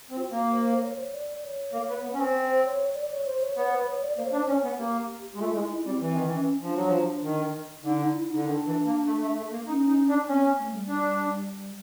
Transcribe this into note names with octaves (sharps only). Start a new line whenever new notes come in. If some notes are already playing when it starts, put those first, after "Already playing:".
C4
F4
F#4
A#3
C5
C#5
C5
C#5
D5
C#5
A#3
B3
B3
C#4
C4
C5
C#5
D5
C#5
C5
C#5
B3 C#5
C5
B4
C#5
D5
A#3 C5
C#5
D4 C5
D5
C#4 C#5
B3
A#3 G4
G#3
A3 F4
G#3 E4
E4
G3 C4
E3 C4
D#3
E3
C#4
F3 D4
F#3
F3
D#3
D3 D#4
D#4
E4
D3 D#4
D#3 D4
E3
A#3
A3
A3
A3
A#3
C#4 D#4
D#4
D4
C4 C#4
B3
A3
G3
D4